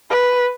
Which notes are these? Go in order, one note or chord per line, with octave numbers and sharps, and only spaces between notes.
B4